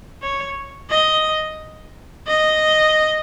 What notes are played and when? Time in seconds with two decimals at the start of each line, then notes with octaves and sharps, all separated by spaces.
0.23 C#5
0.90 D#5
2.27 D#5